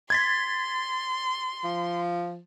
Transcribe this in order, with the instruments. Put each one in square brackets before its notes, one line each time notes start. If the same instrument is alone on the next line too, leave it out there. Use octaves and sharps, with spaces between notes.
[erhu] C6 [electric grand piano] G#6 A6 B6
[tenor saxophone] F3